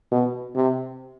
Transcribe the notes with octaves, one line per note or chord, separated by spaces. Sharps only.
B2
C3